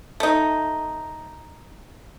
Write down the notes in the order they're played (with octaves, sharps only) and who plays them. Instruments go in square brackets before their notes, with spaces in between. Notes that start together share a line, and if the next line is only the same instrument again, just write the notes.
[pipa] A3 D#4